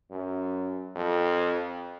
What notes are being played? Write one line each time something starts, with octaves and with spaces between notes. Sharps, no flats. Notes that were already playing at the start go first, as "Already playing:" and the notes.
F#2
F2